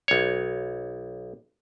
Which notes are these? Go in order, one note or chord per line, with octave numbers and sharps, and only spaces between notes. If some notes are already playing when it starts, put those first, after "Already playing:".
B1 C#5